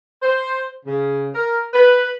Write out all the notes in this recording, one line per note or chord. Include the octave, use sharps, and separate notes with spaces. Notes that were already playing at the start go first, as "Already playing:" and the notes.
C5
C#3
A#4
B4